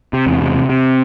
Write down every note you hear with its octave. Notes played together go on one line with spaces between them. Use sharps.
C3
E2
C3
C3
C3